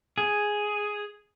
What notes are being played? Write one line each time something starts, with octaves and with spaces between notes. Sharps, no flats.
G#4